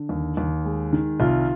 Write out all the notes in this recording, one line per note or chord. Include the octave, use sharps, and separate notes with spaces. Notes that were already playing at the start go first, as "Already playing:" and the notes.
Already playing: D3
D#2
D#2
G#3
D#3
C2 F4